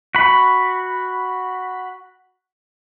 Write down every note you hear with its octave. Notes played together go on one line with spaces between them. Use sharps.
F#4 B5